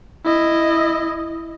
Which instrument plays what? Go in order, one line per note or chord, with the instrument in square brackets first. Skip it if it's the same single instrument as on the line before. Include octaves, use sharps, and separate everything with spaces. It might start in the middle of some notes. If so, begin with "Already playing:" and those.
[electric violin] E4 D#5